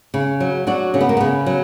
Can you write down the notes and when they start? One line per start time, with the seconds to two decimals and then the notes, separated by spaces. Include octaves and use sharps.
0.14 C#3
0.40 F#3
0.67 F#3 D4 F#4
0.94 C#3 C#4
1.01 B3
1.09 A#3
1.17 C#3 B3
1.46 F#3